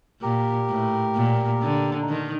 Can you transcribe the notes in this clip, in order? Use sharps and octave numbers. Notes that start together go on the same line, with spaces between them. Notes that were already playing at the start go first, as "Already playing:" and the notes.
A#2 G4 A#4
A2
A#2
D3
D#4
D#3 D4